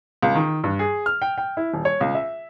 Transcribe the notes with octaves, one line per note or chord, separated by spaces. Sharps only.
C#2
D#3
G2
G#4
F6
G5
G5
E4
D#1
C#5
C#2
E5